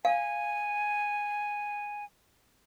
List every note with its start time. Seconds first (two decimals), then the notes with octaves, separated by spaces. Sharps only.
0.05 F5 G#5